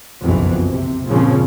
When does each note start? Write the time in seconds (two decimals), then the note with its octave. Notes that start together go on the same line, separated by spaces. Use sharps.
0.24 F#1 B1 F2 B2 E3
0.69 C3
1.06 A#1 G2 C#3 F3 C4 C#4